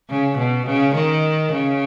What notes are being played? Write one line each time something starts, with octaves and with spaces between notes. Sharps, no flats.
C#3
B2
C#3
D#3
C#3